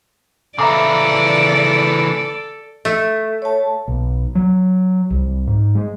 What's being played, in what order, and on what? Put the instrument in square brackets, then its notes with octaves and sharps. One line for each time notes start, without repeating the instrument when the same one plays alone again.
[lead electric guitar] C#3 E3 [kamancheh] A4 [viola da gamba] D5 [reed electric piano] E5 A#5 D6
[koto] A3
[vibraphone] C#5 A5
[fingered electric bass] B1
F#3
C2
G#2
G#3